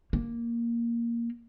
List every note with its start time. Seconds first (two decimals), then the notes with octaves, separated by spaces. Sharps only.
0.13 A#3